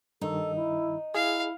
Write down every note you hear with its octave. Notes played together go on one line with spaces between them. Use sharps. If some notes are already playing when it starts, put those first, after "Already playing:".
G2 D#3 D#4 A4
E4
E4 G#4 F5